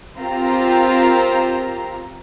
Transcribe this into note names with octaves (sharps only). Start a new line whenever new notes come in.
C4 F4 G4 A#4 C5 A#5